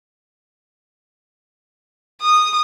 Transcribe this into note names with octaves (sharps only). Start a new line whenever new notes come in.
D#6